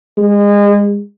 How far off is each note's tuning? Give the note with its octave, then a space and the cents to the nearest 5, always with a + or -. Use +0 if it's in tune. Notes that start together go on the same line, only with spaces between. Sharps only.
G#3 -30